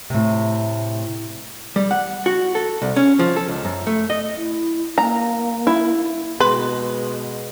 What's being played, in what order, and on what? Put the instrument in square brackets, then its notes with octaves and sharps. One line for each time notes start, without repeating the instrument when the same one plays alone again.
[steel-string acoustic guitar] A2 C3
[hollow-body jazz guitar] G3
F#5
F#4
A4
C2
C#4
F3
A4
C#2
F#2
A3
D#5
[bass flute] E4
[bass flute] A#3 [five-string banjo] A#5
[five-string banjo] E4
[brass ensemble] B2 [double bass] G#3 [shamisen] B4 [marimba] C6